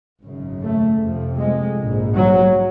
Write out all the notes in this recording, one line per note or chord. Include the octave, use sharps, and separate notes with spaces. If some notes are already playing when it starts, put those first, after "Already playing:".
G#1 F#2 C#3
A3
F1 F2 C3
G#3
A#1 G#2
F#3